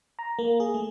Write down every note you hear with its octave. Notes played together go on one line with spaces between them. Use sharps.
A#5
A#3
G#4
A3